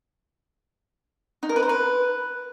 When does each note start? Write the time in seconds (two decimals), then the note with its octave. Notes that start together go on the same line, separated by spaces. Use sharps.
1.43 D#4
1.49 A#4
1.56 B4
1.63 C5
1.69 B4